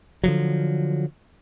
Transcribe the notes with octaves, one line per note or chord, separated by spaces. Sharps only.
D3 F3 F#3